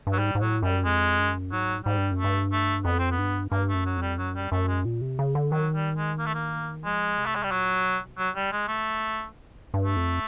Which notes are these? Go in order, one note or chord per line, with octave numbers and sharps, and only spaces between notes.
G2
F#3
G#2 G3
G#2
A2 F#3
F#2 G3
F2 G#3
F#2
G#2 F#3
G#2 G3
G2
F#2
A3
G2
A3
F2 B3
C4
B3
G2
G2 A#3
A3
F#2
F#3
F2 G3
F#2 F#3
G3
F#2 A3
G#3
A#2
C3
C#3
D3
D#3 F#3
G3
G#3
A#3
A3
A#3
F3 G#3
C3
A3
G#3
G3
A#2 F#3
B2
C3 F#3
G3
C#3
G#3
C3 A3
G2
F#2
G2
G2
A3
F2